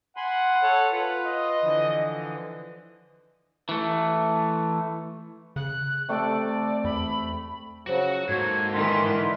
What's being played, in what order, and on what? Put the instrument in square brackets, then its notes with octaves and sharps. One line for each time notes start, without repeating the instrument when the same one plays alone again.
[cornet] F#5 [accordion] G#5 B5 C6
[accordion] A4 C#5 A5
F4 B4
[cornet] D#5
[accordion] D3 E3 F3
[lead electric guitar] E3 A3
[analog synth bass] C#3 [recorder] F#6
[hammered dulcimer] C3 A3 A4 [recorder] D5
[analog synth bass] E2 [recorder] B5
[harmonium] C#3 F3 F#3 [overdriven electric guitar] F#4 F#5
[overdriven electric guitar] G#2 [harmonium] A#3 A4 [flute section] F#4 G#6
[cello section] D#3 E3 B4 [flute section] C6
[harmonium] D3 D#4 E4